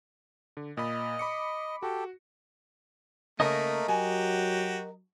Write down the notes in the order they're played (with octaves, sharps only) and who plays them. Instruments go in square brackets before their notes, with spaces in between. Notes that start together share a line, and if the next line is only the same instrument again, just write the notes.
[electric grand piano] D3
[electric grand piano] A#2 B5 [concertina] D#5
[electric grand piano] B5 D6 C#7
[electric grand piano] F#4 [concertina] G4 A4
[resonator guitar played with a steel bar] C#3 [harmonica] A3 A#3 [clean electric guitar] A#4 D#5
[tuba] F#3 [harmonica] F#4 G4 [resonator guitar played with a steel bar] G#5